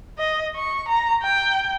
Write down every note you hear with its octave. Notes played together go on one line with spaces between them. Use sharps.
D#5
C#6
A#5
G5